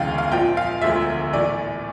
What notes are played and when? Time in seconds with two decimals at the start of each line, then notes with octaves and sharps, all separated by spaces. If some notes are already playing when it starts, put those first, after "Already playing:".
Already playing: E1 D2 C#3 E3 F5 G5
0.18 F5
0.32 A#1 A#2 F3 G5
0.57 F5
0.81 E1 D2 D3 F3 E5
1.33 A#1 A2 E3 D5